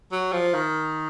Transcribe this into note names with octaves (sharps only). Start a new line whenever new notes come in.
F#3
F3
D#3